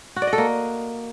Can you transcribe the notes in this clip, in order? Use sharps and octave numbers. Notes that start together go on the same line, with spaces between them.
F#4
D5
D#5
A4
A#3